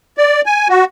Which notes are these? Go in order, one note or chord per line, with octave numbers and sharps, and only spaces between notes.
D5
G#5
F#4